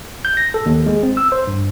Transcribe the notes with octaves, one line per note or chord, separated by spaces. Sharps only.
G6
A#6
A4
D#2
G#3
C4
E6
C5
G2